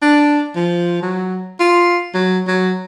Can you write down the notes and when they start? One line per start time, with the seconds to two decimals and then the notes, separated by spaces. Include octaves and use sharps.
0.02 D4
0.56 F3
1.02 F#3
1.60 F4
2.14 F#3
2.47 F#3